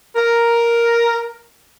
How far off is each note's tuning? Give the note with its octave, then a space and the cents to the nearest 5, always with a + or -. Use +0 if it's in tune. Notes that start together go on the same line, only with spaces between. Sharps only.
A#4 +5